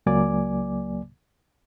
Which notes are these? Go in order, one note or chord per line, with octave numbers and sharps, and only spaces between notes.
C#2 F#3 A#3 D5 G#5 D6